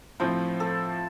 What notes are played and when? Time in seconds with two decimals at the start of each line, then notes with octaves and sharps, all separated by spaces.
0.20 A2 F3 C4 F4
0.60 A4